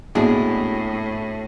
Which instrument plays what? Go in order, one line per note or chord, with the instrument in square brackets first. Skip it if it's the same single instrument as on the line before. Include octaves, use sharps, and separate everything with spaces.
[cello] A2 [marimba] A#3 B3 [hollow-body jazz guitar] D4 E4 F#4 [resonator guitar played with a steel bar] G#4